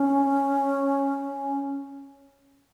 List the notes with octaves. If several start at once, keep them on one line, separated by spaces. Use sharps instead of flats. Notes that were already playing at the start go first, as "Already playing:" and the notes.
Already playing: C#4